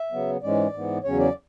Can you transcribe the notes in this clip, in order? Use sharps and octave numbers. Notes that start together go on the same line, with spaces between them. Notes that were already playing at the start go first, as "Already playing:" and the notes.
Already playing: E5
C#3 F#3 B3
G#2 E3 G#3 C#4 D5
G#2 E3 B3
E2 C#3 F#3 C#4 C#5
D5